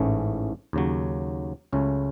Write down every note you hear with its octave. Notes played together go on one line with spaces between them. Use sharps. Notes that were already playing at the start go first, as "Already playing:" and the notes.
Already playing: A1 G#2 E3 A3 C#4
D#2 C#3 F#3
C#2 C#3 F#3 A3 C#4